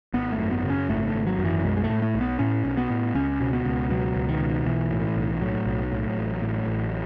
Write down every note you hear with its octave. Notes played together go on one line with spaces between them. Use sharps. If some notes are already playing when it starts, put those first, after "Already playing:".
G#1 B3
A3
F#2
B3
C#3
C#4
G#1 A3
A3
G#1
F#3
F#2
E3
B1 G#3
G#3
A3
A2
A3
B1
B3
A2 C#4
B1
B3
A2
C#2 C#4
B2
B3
C#2
B2 F#3
C#2
D#3
B2
B1 E3
A2
B1
A2 F#3
B1
A2
A1
A2
A1